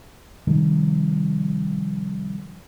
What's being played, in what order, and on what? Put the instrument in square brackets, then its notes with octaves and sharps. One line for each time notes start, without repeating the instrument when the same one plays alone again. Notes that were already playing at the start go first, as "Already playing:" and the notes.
[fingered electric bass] C3 D#3 F3 G3